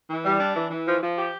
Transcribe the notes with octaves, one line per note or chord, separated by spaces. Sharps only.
E3
G3
D4
E3
E3
F3
F3
G4